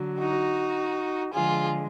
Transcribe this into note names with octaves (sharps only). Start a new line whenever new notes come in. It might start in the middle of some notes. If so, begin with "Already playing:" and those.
Already playing: D3 F#3
D#4 F#4
D3 F3 G#3 F4 G#4